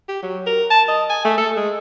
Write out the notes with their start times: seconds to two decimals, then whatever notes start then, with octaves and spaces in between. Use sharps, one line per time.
0.09 G4
0.23 F#3
0.47 A#4
0.70 A5
0.88 D#5
1.10 G#5
1.25 A3
1.38 A4
1.57 G#3